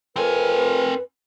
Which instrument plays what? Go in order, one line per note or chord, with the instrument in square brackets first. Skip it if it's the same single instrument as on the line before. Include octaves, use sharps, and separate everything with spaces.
[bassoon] F2 [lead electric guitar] C4 G#5 [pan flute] A#4 [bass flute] B4